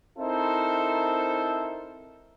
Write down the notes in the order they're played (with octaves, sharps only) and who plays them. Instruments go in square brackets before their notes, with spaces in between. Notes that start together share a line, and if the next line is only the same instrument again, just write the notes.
[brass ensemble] C4 D#4 E4 A4 A#4 C5